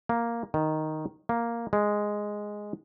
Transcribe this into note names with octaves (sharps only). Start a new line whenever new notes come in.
A#3
D#3
A#3
G#3